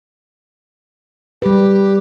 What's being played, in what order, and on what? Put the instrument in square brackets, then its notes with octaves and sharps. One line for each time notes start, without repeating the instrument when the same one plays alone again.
[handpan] G3 B4 [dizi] G4